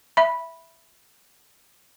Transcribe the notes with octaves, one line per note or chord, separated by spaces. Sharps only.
E5 B5